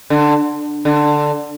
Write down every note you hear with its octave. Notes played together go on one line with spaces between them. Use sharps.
D3
D3